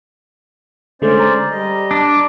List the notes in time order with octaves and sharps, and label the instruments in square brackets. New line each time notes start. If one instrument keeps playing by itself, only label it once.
[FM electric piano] D3 G#3 A3 [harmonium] C#4 C5 D5
[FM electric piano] A#5
[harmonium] G3 D#5
[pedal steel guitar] D4